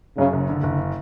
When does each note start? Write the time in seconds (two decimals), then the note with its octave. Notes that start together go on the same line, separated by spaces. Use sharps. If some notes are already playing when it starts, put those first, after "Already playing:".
0.17 F#2 C#3
0.33 F#1
0.49 D3
0.63 F#1